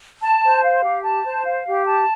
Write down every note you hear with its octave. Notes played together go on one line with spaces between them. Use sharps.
A5
C5
F5
G4
A5
C5
F5
G4
A5